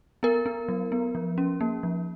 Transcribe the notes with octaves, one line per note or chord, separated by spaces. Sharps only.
B3 A#4
B3
F#3
B3
F3
C#4
A#3
F3